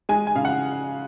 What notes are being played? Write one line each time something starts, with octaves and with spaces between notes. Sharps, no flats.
G#3 G#5
G#5
C#3 F5
F#5